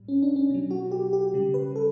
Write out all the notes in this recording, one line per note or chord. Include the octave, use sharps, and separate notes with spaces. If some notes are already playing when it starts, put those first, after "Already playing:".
Already playing: A2 G3
C#4
D4
C#4
B2 F#3
F#4
G4
G4
C#3 G3
B4
A4